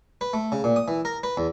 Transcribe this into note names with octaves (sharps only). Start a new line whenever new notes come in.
B4
A3
C#3
A#2
D#6
E3
A#4
B4
E2